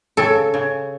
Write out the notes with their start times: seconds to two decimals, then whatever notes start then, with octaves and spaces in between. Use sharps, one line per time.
0.17 C#3 A4
0.54 C#3